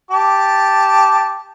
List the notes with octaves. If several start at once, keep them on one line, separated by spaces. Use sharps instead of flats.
G4 A5 D6